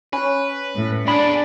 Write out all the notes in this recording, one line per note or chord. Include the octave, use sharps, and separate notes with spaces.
C#4 B4
A2
B3 D4 G#4 B5